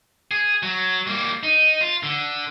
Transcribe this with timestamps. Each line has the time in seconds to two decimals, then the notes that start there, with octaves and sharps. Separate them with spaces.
0.31 G#4
0.63 F#3
1.07 G3 A#3
1.43 D#4
1.81 F4
2.03 D3